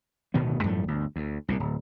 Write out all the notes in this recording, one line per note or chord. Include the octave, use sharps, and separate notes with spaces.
D1 B2 D#3 B3
F#2 A2 F3 A3
G1 D2
D2
C2 A#2
D1